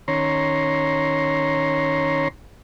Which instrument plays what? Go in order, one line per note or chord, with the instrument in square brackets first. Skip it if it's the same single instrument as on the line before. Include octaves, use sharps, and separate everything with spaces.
[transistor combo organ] D#3 C#4 C#5 A#5 C6